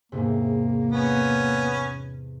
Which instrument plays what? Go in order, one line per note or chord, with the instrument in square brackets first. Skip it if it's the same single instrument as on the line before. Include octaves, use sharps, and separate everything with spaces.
[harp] E2 G#2 C3 [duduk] A#3
[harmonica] B3 C#4